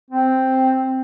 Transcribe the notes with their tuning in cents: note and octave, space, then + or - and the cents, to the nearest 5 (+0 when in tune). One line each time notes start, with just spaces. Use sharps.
C4 +0